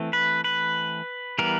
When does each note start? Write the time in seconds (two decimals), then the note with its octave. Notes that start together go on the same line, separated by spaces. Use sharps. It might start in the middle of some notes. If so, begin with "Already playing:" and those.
Already playing: E3 A3 C4
0.13 B4
0.44 B4
1.39 E3 G3 B3 A#4